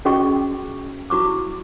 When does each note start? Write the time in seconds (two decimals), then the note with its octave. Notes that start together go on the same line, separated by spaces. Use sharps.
0.05 C#4 F#4 G#4 D#5 G5 C#6
1.10 E4 F#4 C#6 D6